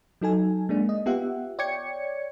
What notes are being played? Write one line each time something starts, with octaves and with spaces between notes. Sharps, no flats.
F#3 D#4 A4 G#5
G#3 A#3 D4
D#5
B3 F4 G4 E5 F#5
C#5 D5 G5 G#6 C#7